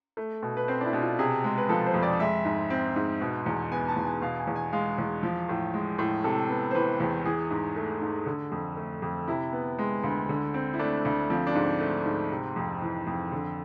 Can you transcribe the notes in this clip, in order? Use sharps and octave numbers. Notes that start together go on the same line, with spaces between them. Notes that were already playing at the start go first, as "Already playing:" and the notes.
A3
B2
B4
C4 C5
D4
E4
B2
F4
C3 G#4
G#3
B4
F3 A4
C5
F2
D5
G#3 E5
G#2
C4
G#2
B2
E2
B3 G#5
A5
E2
G#5
B2 F5
G#5
E2
G#5
G#3 F5
E2
F3
A2
G#3
A2
C3 A4
B3
C5
E3 B4
E2
E3 G#4
G#2
A3
G#2
D3
F2
A3
F2
C3 E4
B3
G#3
D2
D3
C4
E4
A3 D4
D2
F3 C4
D4
G#2
C4
A3
G#2
C3
F2
E3
F2
D3